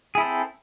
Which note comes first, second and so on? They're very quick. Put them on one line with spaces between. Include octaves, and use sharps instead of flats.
G#4 E4 A4 C4